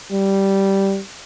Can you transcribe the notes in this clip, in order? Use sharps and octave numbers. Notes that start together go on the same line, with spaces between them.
G3